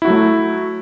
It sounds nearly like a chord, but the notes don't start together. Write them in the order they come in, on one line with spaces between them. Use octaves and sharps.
E4 F#4 F#3 A3